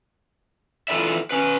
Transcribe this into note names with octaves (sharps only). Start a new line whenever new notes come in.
E3 F4 A4 B4 D5 E5
C#4 B4